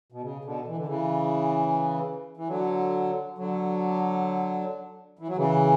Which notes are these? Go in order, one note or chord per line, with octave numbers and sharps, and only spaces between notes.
B2
C#3
B2 D3
E3
D3
C#3 E3
E3
D3 F#3
D3 F#3
E3
F#3
C#3 E3